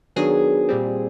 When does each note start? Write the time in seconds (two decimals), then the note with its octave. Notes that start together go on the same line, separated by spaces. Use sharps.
0.16 D#3 F#3 B3 D4 G#4
0.69 A#2 G3 C4